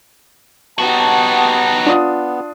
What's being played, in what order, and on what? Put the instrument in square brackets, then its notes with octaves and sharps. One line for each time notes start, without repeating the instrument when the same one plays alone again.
[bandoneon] B3 [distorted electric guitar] D#4 F#4 [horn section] G4 G5 A5
[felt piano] D4 F4 D#6